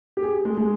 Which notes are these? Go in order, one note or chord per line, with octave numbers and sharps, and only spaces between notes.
G4
G#4
G#3
G#3